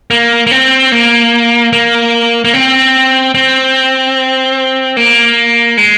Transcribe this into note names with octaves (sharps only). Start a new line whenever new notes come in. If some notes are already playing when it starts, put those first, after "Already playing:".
A#3
A#3
C4
A#3
A#3
A#3
C4
C4
A#3
G#3